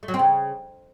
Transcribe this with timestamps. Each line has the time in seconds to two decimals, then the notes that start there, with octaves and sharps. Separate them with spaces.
0.03 A3
0.08 F#3
0.14 C4
0.19 C#3